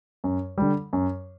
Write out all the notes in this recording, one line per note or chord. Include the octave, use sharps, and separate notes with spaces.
F#2
D3 G3
F#2